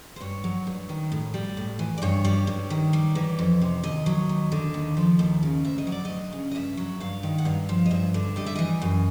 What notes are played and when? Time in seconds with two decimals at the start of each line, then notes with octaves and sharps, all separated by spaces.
0.16 C5
0.20 G2 C#5
0.44 F#3
0.67 G2
0.89 D#3
1.12 A2
1.34 G3
1.57 A2
1.79 E3
1.98 D5
2.02 G2 C#5
2.25 G3
2.47 G2
2.70 D#3
2.93 G3
3.15 E3
3.39 F2
3.61 C3
3.83 D#2 D#5
4.06 F#3
4.29 D#2
4.52 D3
4.74 D#2
4.97 F3
5.19 D#2
5.43 C#3
5.65 D2 E5
5.78 D#5
5.87 F#3
5.92 D5
6.05 D#5
6.10 D2
6.32 C#3
6.51 D#5
6.55 G2 E5
6.77 F#3
7.00 G2 F5
7.23 D#3
7.38 F#5
7.45 G2 F5
7.69 F3
7.86 D#5
7.91 G2 E5
8.14 D3
8.36 G3 D#5
8.46 E5
8.55 E3 D#5
8.82 F#2